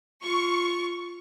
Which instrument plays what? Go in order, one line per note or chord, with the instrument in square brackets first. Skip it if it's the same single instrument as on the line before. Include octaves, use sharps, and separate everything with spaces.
[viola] F4 [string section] C#6